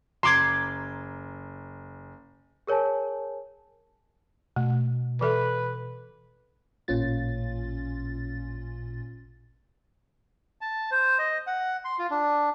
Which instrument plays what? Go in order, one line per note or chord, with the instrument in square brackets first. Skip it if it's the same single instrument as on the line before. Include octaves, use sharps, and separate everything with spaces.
[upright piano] F#1 [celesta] A#5 G#6 [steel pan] C6 D6
[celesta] G#4 A#4 C#5 G#5 A5
[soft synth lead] B2 [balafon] A3
[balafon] E3 A4 E5 [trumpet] B4
[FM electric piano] A1 A#2 C#4 F4 A6
[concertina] A5
C5
D#5
F#5
C6
F4
D4